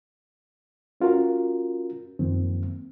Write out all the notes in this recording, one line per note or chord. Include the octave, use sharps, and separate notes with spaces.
C#4 F4 F#4 A#4
F#2 D#3 F3 A#3 C4